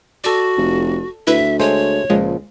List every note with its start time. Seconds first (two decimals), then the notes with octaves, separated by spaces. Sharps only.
0.24 F#4 A4 D5
0.58 F1
1.27 D2 E4 B4 E5 E6
1.60 G#3 A3 C5 C#5
2.10 C#2 A#2 F3 G#3